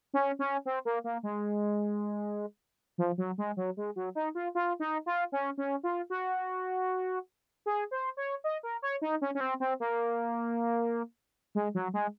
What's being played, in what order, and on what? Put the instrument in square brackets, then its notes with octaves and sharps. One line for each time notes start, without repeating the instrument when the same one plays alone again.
[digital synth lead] C#4
C#4
C4
A#3
A#3
G#3
F3
F#3
G#3
F#3
G#3
F#3
D#4
F4
F4
D#4
F4
C#4
C#4
F4
F#4
G#4
C5
C#5
D#5
A#4
C#5
D#4
C#4
C#4
C4
C4
A#3
G#3
F#3
G#3